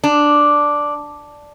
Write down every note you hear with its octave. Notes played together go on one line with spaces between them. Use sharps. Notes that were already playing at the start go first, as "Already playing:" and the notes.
D4